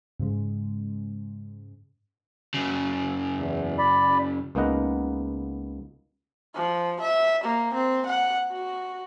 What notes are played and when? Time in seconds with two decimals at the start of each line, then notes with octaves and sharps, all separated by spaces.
0.20 G#2 C#3 G#3
2.54 F#2 C#3
3.37 E2
3.78 D5 B5
4.55 C#2 A#3 B3 D#4 F#5 A#5
6.55 F3
7.00 E5
7.44 A#3
7.74 C4
8.06 F#5
8.52 F#4